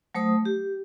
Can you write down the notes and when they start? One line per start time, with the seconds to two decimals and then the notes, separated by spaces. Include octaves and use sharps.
0.15 F#3 A3 C5 D#6
0.45 G4